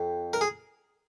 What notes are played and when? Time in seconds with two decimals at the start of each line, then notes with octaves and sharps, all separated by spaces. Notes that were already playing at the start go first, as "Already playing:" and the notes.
Already playing: F2
0.33 A#4
0.41 G#4